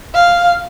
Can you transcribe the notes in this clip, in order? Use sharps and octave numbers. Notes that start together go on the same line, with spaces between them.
F5